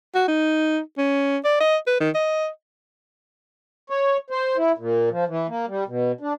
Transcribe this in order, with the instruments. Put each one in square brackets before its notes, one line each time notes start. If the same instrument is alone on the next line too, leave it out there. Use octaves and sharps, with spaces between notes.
[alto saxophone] F#4
D#4
C#4
D5
D#5
B4
D#3
D#5
[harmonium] C#5
C5
E4
A#2
F3
E3
A#3
G3
B2
D4